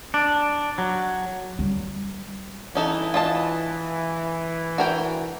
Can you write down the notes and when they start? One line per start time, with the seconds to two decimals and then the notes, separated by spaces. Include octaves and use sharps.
0.14 D4
0.78 F#3
1.59 G3
2.75 E3 C#4 D#4 A4
3.14 F4 D#5 A5
4.78 F#4 A#4 G5